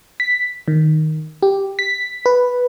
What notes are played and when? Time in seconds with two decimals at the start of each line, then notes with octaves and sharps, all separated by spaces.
0.20 B6
0.68 D#3
1.43 G4
1.79 B6
2.26 B4